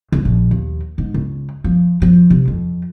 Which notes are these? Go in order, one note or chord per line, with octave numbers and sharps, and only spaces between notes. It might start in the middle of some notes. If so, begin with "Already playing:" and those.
C#2
A#1
D#2
G#2
C#2
F3
F3
C3
F2